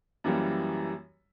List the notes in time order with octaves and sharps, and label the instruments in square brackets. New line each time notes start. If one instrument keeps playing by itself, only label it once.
[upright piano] F#2 E3 G3 A#3